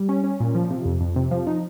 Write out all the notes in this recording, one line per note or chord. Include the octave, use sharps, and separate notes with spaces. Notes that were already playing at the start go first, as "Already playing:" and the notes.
Already playing: G3
C#4
C#4
A#2
F3
C3
F2
F2
C3
F3
D#4